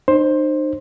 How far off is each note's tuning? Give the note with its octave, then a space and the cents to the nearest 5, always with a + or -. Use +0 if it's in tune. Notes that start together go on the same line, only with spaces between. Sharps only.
D#4 -40 C5 +15